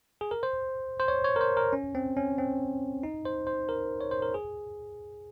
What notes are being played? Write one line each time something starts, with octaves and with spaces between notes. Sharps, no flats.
G#4
A#4
C5
C5
C#5
C#5
A#4
C5
A#4
C#4
C4
C#4
C4
D#4
C5
C5
A#4
C#5
C5
A#4
G#4